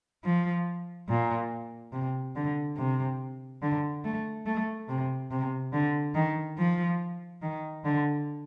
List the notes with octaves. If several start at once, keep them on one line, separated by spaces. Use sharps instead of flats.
F3
A#2
C3
D3
C3
D3
A3
A3
C3
C3
D3
D#3
F3
D#3
D3